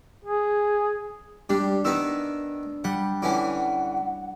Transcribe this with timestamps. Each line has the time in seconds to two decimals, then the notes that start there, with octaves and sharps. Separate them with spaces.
0.25 G#4
1.49 G3 D4
1.85 D#3 B3 D#4 E6
2.84 G3 F#5
3.22 D3 E3 C#4 F#5